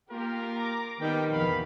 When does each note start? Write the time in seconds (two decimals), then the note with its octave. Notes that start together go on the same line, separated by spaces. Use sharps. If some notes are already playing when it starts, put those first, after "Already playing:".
0.11 A#3 F4 G4 A#4
0.56 A#5 D6
1.01 D#3 G3 B3 G5
1.33 A#1 E2 B2 F5 B5